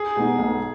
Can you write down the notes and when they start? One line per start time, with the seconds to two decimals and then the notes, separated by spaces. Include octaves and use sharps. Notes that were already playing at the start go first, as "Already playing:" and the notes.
Already playing: G#4
0.16 B2 G#3 B3 D#4
0.39 B1